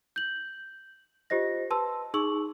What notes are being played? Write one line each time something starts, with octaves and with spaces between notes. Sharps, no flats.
G6 F#7
F4 G4 C5 D#5 A#6
B4 A5 C6 E6
D#4 G#4 C#6 E6 F#7